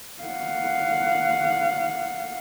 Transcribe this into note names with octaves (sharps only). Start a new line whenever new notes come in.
F5 F#5